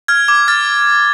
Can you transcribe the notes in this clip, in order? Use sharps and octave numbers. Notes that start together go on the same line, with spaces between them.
F6 G#6
D6 G#6
F6 A6